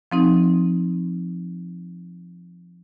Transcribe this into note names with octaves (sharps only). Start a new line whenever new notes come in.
F3 C4 D#4